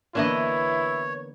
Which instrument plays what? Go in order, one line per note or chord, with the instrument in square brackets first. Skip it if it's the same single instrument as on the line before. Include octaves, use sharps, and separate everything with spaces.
[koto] D3 E3 D#5 [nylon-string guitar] A#3 B3 [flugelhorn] E4 [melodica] C#5